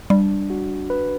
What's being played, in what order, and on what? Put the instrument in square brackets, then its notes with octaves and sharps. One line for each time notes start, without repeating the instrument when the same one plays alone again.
[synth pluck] G3 [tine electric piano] D4
[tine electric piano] F#4
B4